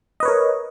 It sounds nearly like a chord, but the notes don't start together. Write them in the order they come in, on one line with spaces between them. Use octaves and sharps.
D#5 B4 C#5 A#4